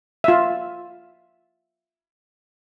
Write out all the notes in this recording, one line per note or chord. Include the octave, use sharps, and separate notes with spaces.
F4 E5